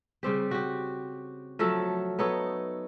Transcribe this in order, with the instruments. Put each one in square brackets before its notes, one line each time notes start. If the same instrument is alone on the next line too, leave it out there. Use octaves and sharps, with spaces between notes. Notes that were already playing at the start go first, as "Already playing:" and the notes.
[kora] C#3 G3 C4 G4
F#4 G4
F3 F#3 A3 A4
B3 D#4 A4 C#5